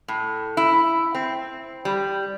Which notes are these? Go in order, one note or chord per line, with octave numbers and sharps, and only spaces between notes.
A2
E4
C4
G3